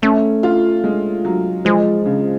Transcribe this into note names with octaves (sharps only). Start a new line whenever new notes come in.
A3 C#4
F4
G#3
F#3
F3 G#3
C#3